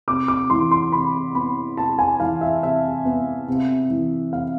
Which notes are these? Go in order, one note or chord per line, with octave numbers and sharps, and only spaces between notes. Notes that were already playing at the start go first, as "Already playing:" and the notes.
C3 D6
D6
E3 C6
C6
C3 B5
B3 B5
C3 A5
G#5
E3 F5
E5
C3 E5
B3
C3
E3
C3 F5